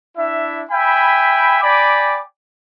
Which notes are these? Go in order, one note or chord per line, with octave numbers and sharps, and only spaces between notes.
D4 E4 E5
E5 G5 G#5 B5
D5 G5 G#5 B5 D6